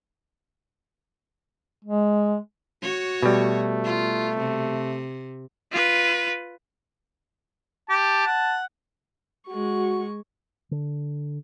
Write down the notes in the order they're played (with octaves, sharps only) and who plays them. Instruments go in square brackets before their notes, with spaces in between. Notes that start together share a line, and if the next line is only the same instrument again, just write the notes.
[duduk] G#3
[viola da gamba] F#4 C#5
[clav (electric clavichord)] B2 G3 [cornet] A3
[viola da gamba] F4
C3
[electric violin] F4 B4
[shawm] G4 [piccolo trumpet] A5
[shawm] F#5
[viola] G#3 C#6 [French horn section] F#4
[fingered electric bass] D3